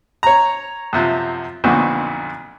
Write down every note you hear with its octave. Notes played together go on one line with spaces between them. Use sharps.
C#5 A#5
F#2 C3 F3
B1 F2 A#2 D3 C4 F#4